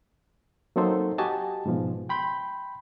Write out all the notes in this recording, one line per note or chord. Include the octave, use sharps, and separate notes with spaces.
F#3 A#3 C4 D#4 A4 C5
F#4 G4 D#5 G#5 A5
G#2 B2 F3
G5 B5 C6 G6